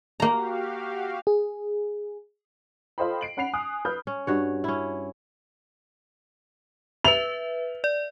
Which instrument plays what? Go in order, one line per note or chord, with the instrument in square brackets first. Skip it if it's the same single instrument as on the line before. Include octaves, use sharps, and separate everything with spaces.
[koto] A#3 A#5 [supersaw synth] F#4 G4 F5
[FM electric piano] G#4
[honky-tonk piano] F4 A4 C5 D#5 G5 B5
C7 D7 F#7
C#4 F#5 B5 C7 F7
G#5 D#6 F#6
B4 B5 D#6 F6 G6
[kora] C#4
G2 F#4 C#5
C#4 E4
[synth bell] B4 E5 [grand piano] F7
[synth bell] D5